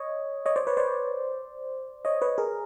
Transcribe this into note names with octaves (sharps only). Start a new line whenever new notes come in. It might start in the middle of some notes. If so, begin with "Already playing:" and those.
Already playing: C#5 D#5
C#5 D#5
C5 D5
B4 C#5
C5 D5
C#5 D#5
B4 C#5
G#4 A#4